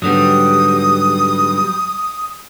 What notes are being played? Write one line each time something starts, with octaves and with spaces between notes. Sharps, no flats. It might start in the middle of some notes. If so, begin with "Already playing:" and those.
G#2 D3 F#3 G3 B3 D#6